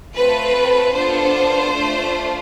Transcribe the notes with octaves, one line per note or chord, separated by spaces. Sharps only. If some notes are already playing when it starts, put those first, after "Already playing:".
A3 C4 F4 A4 B4
B3 D4 F4 A4 C5
A3 D4 F4